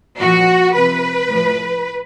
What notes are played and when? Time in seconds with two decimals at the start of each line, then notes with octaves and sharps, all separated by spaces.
0.21 A#2 F3 F#4
0.75 C3 F3 B4
1.29 A2 F3